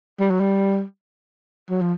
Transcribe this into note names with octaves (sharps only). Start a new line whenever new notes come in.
G3
F#3
G3
F#3
F3